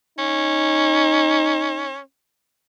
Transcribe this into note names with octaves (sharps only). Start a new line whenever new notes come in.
C#4 D#4